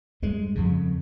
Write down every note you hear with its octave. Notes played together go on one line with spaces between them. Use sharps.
G2 G#3
F2 C#3